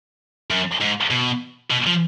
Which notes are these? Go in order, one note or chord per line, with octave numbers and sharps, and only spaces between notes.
F#2
G#2
B2
B2
F3